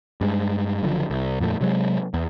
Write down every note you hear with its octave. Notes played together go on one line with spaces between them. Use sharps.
G2 G#3
F#1 F#2 D3 F3
C2
F2 A#2 G3 A3
C3 F#3 G#3
E2